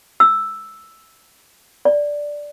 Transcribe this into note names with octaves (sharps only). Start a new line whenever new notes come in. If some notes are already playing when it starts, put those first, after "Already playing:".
E6
D5